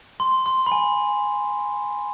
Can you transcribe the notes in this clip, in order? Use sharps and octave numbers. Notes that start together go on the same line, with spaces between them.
C6
C6
B5
G#5